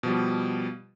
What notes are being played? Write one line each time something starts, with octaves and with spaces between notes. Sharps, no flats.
B2 F3 G3